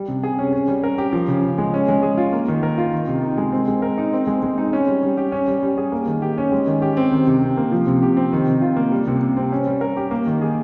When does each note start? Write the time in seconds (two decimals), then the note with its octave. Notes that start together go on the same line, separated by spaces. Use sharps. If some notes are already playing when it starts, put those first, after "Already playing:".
Already playing: G3
0.08 C3
0.23 G#4
0.39 C#4
0.53 C#4
0.68 G3
0.84 A#4
0.98 G4
1.13 F3
1.28 C#3
1.44 C#3
1.58 G#3
1.74 C#4
1.88 G#3
2.03 G#4
2.18 F4
2.32 A#3
2.48 D#3
2.63 A#4
2.78 F4
2.93 D#3
3.07 C3
3.22 D#4
3.38 G#3
3.52 C4
3.68 G#3
3.82 A#4
3.98 D#4
4.13 C4
4.27 G#3
4.43 G#3
4.58 D#4
4.73 C#4
4.88 G3
5.03 G3
5.17 G4
5.32 C#4
5.48 G3
5.63 G3
5.78 G#4
5.92 A#3
6.07 D#3
6.22 G4
6.38 C#4
6.52 G#3
6.67 D#3
6.82 G4
6.97 C4
7.12 D#3
7.27 C3
7.43 C3
7.57 A#3
7.72 F3
7.87 C3
8.02 G4
8.17 C4
8.33 D#3
8.46 C3
8.62 F4
8.76 A#3
8.92 G3
9.07 C3
9.21 C3
9.37 C4
9.52 C#4
9.67 G3
9.81 A#4
9.97 G4
10.11 A#3
10.26 D#3
10.42 G#4